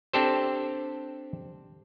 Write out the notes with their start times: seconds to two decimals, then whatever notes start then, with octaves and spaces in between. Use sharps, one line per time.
0.14 C4 D4 G4 A4 C5